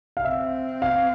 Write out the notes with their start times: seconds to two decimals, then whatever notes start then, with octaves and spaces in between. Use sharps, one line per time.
0.17 F5
0.25 C4 E5
0.82 F5